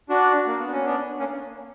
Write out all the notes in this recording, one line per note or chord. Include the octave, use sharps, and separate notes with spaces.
D4 F#4
A#3
B3
C#4
B3 D4
A#3 C#4